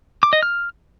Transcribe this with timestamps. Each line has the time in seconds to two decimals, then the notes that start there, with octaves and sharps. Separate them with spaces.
0.23 D6
0.33 D#5
0.43 F6